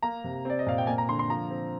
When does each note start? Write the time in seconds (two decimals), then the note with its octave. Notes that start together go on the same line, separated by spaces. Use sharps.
0.03 A#3 A#5
0.24 C3
0.45 C4 D5
0.59 D#5
0.66 A#2 F5
0.78 G5
0.87 A#3 G#5
0.98 A#5
1.09 D3 C6
1.19 C6
1.30 F3 A#5
1.51 C4